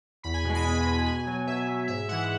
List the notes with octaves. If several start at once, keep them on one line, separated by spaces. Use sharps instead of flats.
E2 B5
G#5
B2 G#3 G#5
B5
E2 G#5
B2 G#3
B2 G#5
F#3
B2 E5
F#3
G#2 E5
E3 G#3 F#5